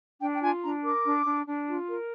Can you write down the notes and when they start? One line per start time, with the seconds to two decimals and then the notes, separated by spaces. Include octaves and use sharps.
0.20 D4 G5
0.34 G5
0.41 F4 G#5
0.62 D4 A#5
0.83 A#4 D6
1.05 D4
1.25 D4
1.46 D4
1.67 F4
1.88 A#4